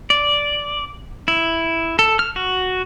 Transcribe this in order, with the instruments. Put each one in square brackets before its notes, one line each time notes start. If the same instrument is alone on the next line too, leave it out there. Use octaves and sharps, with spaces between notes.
[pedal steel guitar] D5
E4
A4
F6
F#4